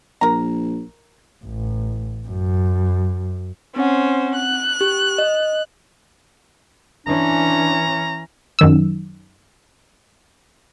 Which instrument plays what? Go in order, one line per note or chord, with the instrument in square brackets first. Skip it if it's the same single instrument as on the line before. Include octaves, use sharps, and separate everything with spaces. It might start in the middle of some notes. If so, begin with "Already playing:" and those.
[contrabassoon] A#1 [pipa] A#4 A#5
[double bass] A1
F#2
[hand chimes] C4 F#5 [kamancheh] C#4 C5
[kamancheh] F#6
[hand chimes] G4
D#5
[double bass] E3 C#4 [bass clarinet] D4 [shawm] A#5
[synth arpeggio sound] F#2 D#3 E6